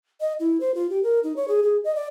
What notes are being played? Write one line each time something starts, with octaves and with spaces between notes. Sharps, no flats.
D#5
E4
C5
F4
G4
A#4
D#4
C#5
G#4
G#4
D#5
D5